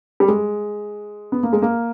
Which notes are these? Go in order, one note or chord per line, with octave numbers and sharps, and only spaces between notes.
G3
G#3
B3
A#3
G#3
A#3